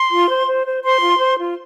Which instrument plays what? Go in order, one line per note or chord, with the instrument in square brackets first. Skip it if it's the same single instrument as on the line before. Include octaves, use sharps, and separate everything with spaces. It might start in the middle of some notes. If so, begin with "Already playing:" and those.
Already playing: [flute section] C6
F4
C5
C5
C5
C5 C6
F4
C5
F4